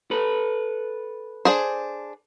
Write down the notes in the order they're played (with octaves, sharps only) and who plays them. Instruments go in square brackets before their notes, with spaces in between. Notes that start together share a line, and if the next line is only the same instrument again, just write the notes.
[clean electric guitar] A4 B4
[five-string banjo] D4 G#4 C5